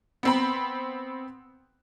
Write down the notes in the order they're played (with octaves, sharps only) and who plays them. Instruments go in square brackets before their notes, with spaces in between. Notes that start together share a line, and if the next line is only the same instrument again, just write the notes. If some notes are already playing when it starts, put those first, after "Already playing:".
[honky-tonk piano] B3 C4 B5